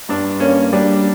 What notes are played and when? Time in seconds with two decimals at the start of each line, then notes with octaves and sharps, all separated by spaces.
0.09 G2 D4
0.40 A#3 C#4
0.73 G3 D4